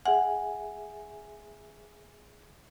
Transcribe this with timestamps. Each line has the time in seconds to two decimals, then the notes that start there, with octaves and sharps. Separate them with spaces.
0.06 G#4 E5 F#5 G#5